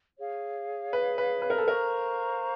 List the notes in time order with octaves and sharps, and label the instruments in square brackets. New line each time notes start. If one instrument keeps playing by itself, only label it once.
[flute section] G#4 C#5 F5
[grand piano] B4
B4
B4
A#4
A4
[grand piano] A#4 [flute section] C5 F5 A#5 C#6